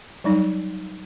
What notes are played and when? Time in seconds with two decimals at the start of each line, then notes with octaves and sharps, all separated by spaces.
0.24 F#3 G3 D#4